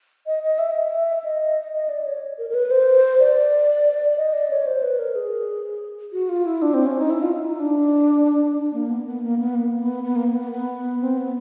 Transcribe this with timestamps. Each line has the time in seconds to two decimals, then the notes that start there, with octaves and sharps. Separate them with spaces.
0.26 D#5
0.43 D#5
0.59 E5
0.75 E5
1.24 D#5
1.73 D#5
1.89 D5
2.06 C#5
2.38 A#4
2.50 A#4
2.54 B4
2.71 C5
3.20 D5
4.17 D#5
4.33 D5
4.51 C#5
4.67 C5
4.83 B4
4.99 A#4
5.16 G#4
6.13 F#4
6.29 F4
6.46 E4
6.62 D4
6.74 C4
6.86 C#4
6.98 D#4
7.10 E4
7.22 F4
7.35 E4
7.48 D#4
7.59 D4
8.58 D4
8.73 A#3
8.90 B3
9.06 B3
9.23 A#3
9.39 B3
9.55 A#3
9.79 B3
10.03 B3
10.16 A#3
10.28 B3
10.40 B3
10.52 B3
11.01 C4
11.17 B3